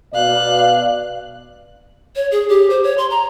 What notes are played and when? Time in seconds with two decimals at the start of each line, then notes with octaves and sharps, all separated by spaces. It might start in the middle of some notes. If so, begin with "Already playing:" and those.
0.14 B2 D5 F5 F#6
2.16 C#5
2.32 G#4
2.49 G4
2.70 C5
2.84 C#5
2.98 C6
3.10 A#5